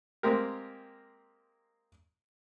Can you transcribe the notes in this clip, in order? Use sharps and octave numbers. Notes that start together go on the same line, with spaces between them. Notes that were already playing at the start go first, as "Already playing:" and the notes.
G#3 A#3 C4 G4 A#4